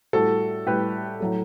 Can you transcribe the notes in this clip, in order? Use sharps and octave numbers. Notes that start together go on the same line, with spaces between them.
A2 G3 F#4 A4
A2 G3 G4 B4
A2 F#3 A3